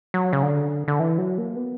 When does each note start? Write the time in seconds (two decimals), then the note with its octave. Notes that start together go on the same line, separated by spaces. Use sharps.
0.14 F#3
0.33 C#3
0.43 D3
0.88 D3
1.00 E3
1.18 F#3
1.38 A#3
1.56 B3